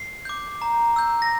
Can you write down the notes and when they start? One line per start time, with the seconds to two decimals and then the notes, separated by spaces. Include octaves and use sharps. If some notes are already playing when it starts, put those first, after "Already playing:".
Already playing: C7
0.25 D6 G6
0.62 A#5
0.96 E6 G6
1.22 A#6